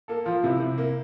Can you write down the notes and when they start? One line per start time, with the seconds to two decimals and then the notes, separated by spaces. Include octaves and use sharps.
0.08 A#3 A4
0.25 F3 F4
0.44 C3 E4
0.60 C3
0.78 A#3